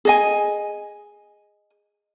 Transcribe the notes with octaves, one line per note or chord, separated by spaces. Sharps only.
G#4 D#5 G#5